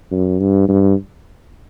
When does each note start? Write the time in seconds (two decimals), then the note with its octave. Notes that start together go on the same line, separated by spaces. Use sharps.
0.12 F#2
0.40 G2
0.68 G2